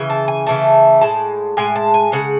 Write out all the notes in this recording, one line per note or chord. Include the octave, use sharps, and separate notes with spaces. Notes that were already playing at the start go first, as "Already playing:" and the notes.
Already playing: C#3 E3
A5
G#5
C#3 E3 A3 A5
A2 G#3 A5
A2 G#3 G#5
A5
G#5
C#3 G#3 F#5